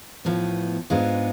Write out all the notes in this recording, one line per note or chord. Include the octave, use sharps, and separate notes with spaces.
A2 F3 B3
G#2 G#3 B3 D4 F4